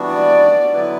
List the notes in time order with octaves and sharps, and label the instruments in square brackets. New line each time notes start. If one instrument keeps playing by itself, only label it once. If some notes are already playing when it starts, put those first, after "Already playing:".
Already playing: [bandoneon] E3 G3 B3 D4 F#4
[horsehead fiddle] D5
[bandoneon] D3 F#3 B3 E4 B4